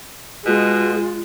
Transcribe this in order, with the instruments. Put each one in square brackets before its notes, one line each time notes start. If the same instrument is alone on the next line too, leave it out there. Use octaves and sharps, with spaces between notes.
[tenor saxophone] B2 [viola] G#3 [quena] F4